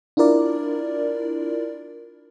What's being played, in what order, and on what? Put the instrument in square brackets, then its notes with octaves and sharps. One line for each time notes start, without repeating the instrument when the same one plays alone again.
[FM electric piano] D4 E4 F4 A#4 D5